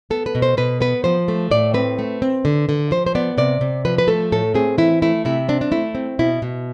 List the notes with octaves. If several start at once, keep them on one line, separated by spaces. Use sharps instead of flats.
B3 A4
B4
B2
C5
B2 B4
B3 B4
F3 C5
A3
A2 D5
C4 B4
A3
C4
D3
D3
F3 C5
C5
B3 D5
C3 D5
C3
F3 B4
B4
A3 A4
A2 A4
C4 G#4
E3 E4
A3 E4
C3 E4
C4 D4
D4
A3 E4
C4
B2 E4
B2